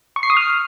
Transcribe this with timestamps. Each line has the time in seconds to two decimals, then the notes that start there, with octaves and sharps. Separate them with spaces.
0.16 C#6
0.23 C7
0.30 D#6
0.37 F6